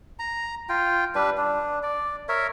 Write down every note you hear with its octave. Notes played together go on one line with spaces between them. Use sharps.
A#5
F4 G5
G3 D4 B4
D4
D5
A#4 C#5 E5